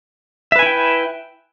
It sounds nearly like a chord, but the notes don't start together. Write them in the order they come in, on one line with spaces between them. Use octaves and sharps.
E5 B4 G#5 E4 G5